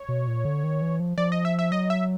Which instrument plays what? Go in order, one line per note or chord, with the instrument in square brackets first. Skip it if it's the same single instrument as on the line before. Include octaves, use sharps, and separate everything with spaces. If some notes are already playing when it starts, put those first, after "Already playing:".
Already playing: [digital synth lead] C#5
[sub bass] B2
A#2
D3
D#3
E3
F3
[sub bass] F3 [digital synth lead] D5
[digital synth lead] D#5
E5
E5
[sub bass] F#3 [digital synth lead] D#5
[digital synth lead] E5